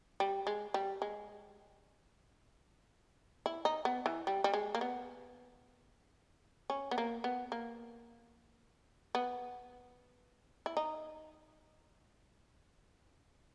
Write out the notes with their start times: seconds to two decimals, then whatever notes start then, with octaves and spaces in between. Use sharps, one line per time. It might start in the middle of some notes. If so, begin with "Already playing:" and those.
0.20 G3
0.47 G#3
0.74 G3
1.02 G#3
3.46 E4
3.65 D#4
3.85 B3
4.06 E3
4.27 G3
4.44 G3
4.54 G#3
4.75 A#3
4.81 B3
6.70 C#4
6.91 B3
6.98 A#3
7.24 B3
7.52 A#3
9.15 B3
10.66 E4
10.77 D#4